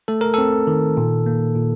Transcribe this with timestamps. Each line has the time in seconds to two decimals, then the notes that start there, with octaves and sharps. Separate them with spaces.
0.08 A3 A4
0.21 A#4
0.34 C4 A4
0.67 D#3
0.97 A#2
1.26 A#3
1.56 A#2